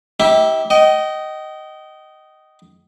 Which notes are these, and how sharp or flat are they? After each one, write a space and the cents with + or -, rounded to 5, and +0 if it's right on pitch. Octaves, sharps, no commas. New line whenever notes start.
E4 -45 G4 -5 E5 +0
D#5 +0 G5 -35